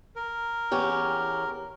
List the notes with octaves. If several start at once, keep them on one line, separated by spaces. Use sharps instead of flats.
A#4
E2 C#4 G4